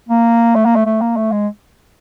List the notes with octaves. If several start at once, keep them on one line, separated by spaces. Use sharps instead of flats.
A#3
A3
A#3
A3
A3
A#3
A3
G#3